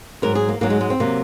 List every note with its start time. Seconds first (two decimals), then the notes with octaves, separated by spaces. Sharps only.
0.22 G#2 F#3 A#4
0.35 G#4
0.48 A#3
0.61 G#2 F#3 A#3
0.70 G#3
0.81 G#3
0.90 C4
1.00 C3 F#3 A#3